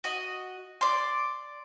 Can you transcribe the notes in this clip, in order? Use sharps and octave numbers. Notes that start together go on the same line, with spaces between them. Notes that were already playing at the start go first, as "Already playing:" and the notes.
F#4 D#5
D5 C6